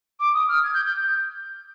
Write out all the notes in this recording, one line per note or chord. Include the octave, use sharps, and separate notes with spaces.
D6
D#6
F6
G#6
G6
G6